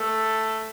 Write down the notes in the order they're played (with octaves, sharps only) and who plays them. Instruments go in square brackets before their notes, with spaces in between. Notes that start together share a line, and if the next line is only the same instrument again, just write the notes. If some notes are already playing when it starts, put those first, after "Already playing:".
Already playing: [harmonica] A3 A4